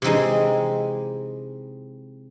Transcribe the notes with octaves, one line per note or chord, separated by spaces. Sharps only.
C3 E3 G#3 C4 D#4